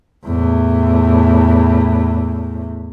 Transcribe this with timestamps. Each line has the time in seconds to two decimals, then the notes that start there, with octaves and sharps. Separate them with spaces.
0.25 E2 A2